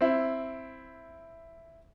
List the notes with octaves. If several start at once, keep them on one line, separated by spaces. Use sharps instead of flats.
C4 E4